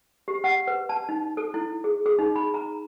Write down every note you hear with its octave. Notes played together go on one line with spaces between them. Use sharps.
G4
F#5
B4
A5
D#4
A4
E4
G#4
G#4
D#4
B5
A#5